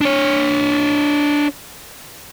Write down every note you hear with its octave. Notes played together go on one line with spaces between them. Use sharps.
D4 C#5